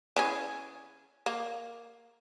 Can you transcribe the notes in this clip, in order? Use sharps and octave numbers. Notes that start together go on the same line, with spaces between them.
E3 C#4 G#4
A#3